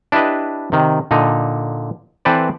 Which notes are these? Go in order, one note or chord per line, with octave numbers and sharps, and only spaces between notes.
D4 E4 G4 B4 D#5
C3 D#3
A#2 D3 D#4
E3 C4 A4 B4 C5 D5